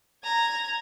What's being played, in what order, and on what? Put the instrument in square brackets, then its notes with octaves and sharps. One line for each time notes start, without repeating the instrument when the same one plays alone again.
[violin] A#5 G#6